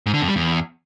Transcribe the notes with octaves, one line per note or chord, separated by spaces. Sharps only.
G#2
D3
F2
G3
E2